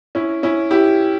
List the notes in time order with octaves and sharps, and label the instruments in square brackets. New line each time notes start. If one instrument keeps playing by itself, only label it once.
[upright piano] C#4 E4
C#4 E4
E4 G4